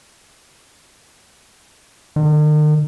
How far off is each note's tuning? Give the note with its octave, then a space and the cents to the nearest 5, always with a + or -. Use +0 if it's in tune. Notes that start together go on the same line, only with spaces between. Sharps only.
D#3 -45